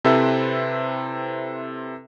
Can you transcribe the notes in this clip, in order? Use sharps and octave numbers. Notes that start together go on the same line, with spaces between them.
C3 C4 E4 A4 B4 E5